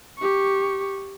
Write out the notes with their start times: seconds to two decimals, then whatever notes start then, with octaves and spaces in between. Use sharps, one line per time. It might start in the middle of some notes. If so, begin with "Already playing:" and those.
0.18 G4 C#6